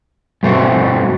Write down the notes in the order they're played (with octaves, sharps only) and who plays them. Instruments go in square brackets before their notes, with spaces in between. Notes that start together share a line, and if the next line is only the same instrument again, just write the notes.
[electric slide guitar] G2 B2 A3 C4 F#4